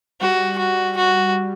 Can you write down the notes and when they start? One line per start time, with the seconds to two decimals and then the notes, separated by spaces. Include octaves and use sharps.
0.21 G3 F#4
0.58 F#4
0.97 F#4